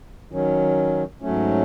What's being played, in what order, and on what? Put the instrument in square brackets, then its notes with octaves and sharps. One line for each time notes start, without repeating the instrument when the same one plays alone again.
[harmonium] D#3 F#3 C#4
G#2 F#3 A3 C#4